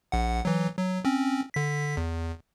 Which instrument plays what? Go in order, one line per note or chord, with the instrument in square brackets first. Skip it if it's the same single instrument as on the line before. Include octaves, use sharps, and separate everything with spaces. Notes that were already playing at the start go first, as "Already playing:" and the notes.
[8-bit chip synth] A#1 F#5
E3 F#3
F#3
C4 C#4
D3 B6
E2